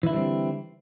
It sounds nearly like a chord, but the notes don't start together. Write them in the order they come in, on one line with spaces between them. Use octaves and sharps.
E3 E4 D3 G3 C4